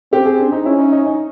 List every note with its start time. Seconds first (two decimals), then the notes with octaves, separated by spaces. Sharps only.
0.13 C4 G4
0.26 G#4
0.40 D4
0.52 D#4
0.66 C#4 E4
0.79 D#4
0.92 D#4
1.07 D#4